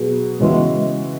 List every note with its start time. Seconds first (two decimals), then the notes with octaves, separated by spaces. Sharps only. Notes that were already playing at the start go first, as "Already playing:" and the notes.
Already playing: B2 F#3 B3 G#4
0.40 C#3 E3 G#3 B3 F#4 E5
0.74 G#3